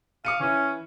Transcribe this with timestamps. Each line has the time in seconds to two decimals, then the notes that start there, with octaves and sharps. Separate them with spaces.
0.25 F5 D6 C#7 D#7
0.40 E3 C#4 E4